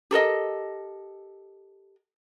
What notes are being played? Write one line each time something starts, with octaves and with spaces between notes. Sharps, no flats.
G4 A4 A#4 D#5